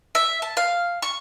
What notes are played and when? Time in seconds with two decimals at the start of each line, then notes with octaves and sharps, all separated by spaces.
0.15 E5
0.42 A5
0.57 F5
1.02 C#6